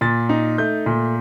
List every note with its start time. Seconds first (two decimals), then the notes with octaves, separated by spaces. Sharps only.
0.01 A#2 A6
0.29 D#4
0.58 A3 G6
0.86 A#2